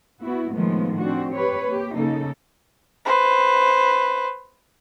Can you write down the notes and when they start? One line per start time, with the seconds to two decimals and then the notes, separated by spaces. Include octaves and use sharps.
0.22 B3 E4 F#4
0.53 A2 D#3 F3 G#3 A#3 B3
0.99 C4 D4 F#4
1.32 G4 B4 C#5
1.66 A#3 G4
1.95 C#3 A#3 D#4 A4
3.05 B4 C5